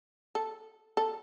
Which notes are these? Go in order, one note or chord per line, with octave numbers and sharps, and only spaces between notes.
A4
A4